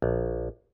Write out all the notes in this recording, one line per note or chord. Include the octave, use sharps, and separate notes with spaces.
A#1